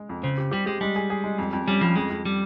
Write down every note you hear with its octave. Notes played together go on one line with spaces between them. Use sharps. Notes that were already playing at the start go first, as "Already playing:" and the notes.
Already playing: G#3
F2
C#3 C4
G4
G3 G4
G#3 G4
G3 G#3
G#4
G#4
G#3
F2
F2
G3 C#4
F3 G3
F2 G#3
F2
G3